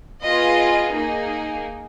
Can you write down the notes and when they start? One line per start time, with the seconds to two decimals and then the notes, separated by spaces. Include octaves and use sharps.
0.25 B3 F4 G#4 D#5
0.94 A#3 D#4 G#4